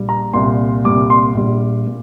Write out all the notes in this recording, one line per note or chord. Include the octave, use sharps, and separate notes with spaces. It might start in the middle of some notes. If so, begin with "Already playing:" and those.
Already playing: A#1 A#2 G3
A#5
C2 A#2 G3 C6
C2 A#2 G3 D6
C6
A#1 A#2 G3
A#2